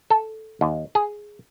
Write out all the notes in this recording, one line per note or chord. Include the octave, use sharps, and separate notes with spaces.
A4
D#2
G#4